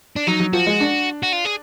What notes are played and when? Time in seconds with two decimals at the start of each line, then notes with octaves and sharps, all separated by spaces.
0.16 D4
0.27 F#3 D#4
0.40 F#3
0.53 F3 F#4
0.67 G#3
0.80 D4
1.23 F#4
1.33 F4
1.45 G#4